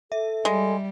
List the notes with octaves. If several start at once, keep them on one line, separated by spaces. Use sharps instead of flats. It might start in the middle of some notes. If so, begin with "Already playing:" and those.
A4 E5
G3 G#3